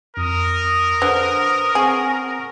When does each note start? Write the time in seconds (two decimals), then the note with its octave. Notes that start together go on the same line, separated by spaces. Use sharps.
0.17 F2 A#4 D#6
1.02 D3 B4 C5
1.75 C4 G#4 F#5 C#6